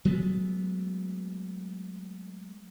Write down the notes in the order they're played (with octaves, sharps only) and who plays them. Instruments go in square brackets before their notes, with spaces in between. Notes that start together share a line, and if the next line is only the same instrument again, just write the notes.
[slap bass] F#3 G#3 A3 B3